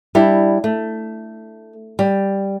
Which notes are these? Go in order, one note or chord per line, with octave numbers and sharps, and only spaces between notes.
G3 D4 E4
A3
G3